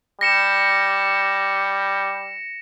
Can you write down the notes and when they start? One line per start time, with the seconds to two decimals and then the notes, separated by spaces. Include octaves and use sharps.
0.21 G3 A#6 C#7 E7